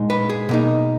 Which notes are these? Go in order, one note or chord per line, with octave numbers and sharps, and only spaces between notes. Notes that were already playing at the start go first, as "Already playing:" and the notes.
Already playing: A#2 G#3 D#4
B4
G#4
B2 A#3 D#4